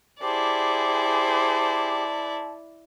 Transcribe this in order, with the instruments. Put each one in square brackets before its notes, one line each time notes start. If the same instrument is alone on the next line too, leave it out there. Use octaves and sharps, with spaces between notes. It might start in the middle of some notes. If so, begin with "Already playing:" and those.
[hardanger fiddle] E4 D5 [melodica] G4 [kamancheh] G#4 C5 [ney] A5